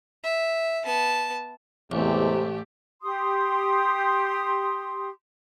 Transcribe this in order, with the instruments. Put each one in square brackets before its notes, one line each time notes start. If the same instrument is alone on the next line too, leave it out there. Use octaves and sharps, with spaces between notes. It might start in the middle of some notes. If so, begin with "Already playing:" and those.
[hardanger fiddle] E5
B3 A5
[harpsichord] A1 [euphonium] E2 [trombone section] C3 G#3 [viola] A3 G4
[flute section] G4 C6 D#6